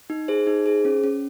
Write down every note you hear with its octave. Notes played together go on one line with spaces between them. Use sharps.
D#4
G#4 C5
D#4
G#4
C#4
C#4